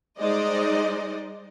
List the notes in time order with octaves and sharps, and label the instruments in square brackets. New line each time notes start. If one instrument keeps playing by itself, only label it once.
[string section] G3 G#3 D#4 C5 D5 D#5